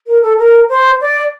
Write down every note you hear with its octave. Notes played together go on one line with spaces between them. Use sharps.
A#4
A4
A#4
C5
D5